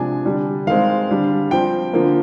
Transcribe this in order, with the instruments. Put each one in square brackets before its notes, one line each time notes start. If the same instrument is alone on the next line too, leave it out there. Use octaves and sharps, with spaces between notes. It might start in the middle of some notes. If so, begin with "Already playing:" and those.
Already playing: [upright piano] C3 F3 G#3 D4 G#5
D3 G3 D4
D#3 G#3 C4 F5
D3 G3 D4
F3 C4 G5
D3 F3 A#3